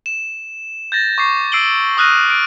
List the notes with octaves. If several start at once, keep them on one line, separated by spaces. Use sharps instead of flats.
E7
G6 A6 A#6
C#6 D6 C7
E6 C7 D7 F#7 G7
C#6 D#6 F6 F#6 A#6 D#7
D7